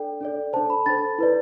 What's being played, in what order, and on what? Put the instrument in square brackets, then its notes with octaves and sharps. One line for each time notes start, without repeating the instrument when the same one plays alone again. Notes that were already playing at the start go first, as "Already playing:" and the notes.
Already playing: [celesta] D4 A4 D5 G5
D4 A4 D5
D4 A4 C5 A5
B5
D4 A4 C5 A6
E4 B4 D5